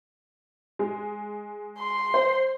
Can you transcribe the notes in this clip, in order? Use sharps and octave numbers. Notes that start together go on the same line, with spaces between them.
G#3
C6
C5